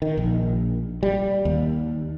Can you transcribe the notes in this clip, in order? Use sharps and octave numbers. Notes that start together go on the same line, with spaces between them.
D#3
A#1
G3
D#2